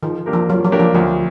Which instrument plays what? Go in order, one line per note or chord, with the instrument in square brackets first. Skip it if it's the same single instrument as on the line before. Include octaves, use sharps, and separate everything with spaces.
[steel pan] D#3 [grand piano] F3
[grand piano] A#3 D4 G4 A#4
[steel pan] F3
[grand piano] F3 [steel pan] F#3
[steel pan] F#3
[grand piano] A#3 D4 G4 A#4
[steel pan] F3
[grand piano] D2 [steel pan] F3